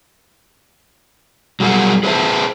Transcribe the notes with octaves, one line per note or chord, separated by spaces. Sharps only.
F#3 G3 G#4 A#4 F#5
G#4 B4 C5 E5 G#5 A5